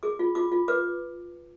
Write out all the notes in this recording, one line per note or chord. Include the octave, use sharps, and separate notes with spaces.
G#4 D6
F4
F4 D6
F4
B4 D6